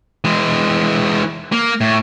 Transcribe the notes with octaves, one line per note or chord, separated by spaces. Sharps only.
E3 G#3
A#3
A2